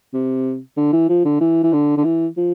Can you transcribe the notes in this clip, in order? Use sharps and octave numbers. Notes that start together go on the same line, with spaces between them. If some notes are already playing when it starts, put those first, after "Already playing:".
C3
D3
E3
F3
D3
E3
E3
D3
D3
E3
F3